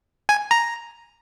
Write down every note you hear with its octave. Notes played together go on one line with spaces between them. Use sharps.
G#5
A#5